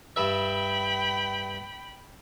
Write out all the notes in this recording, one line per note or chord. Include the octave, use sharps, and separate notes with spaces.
G2 E5 G5 B5